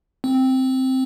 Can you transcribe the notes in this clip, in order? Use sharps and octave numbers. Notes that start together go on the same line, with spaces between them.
C4